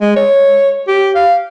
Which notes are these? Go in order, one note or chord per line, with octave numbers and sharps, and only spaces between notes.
G#3
C#5
G4
F5